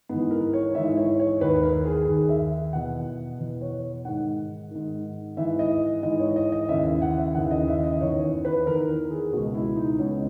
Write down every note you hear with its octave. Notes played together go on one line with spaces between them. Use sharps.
G#2 E3 B3
A#4
C#5
G#2 E3 E5
C#5
C#5
D#2 D#3 B4
A#4
G#4
D#2 D#3 G#4
E5
E2 B2 F#5
E2 B2
C#5
G#2 D#3 F#5
G#2 D#3
G#2 E3 E5
D#5
G#2 E3 D#5
C#5
D#5
D#5
D#2 C#3 E3 E5
E5
F#5
E5
D#2 C#3 E3 F#5
D#5
E5
D#5
E2 D#3 C#5
B4
E2 D#3 A#4
G#4
C#2 B2 F#4
E4
D#4
C#2 B2 C#4